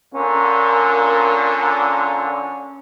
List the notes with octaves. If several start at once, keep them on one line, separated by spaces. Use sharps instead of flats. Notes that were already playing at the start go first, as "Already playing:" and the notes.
A#2 D3 C#4 A#4